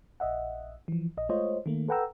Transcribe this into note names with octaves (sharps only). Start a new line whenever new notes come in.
A#1 D#5 E5 F#5
E3 F3
A#1 D#5
G#3 A3 F4 C5 C#5 D#5
D#3 A3 A#3
A4 B4 F#5 G5 A#5 E6